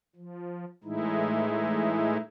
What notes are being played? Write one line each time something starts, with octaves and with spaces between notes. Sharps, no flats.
F3
A2 E3 G#3 D#4 E4